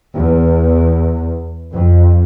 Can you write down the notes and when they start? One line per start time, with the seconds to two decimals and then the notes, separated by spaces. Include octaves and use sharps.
0.13 E2
1.73 F2